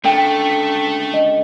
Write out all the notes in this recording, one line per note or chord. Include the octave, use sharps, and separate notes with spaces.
C#2 D3 A3 G5
D#5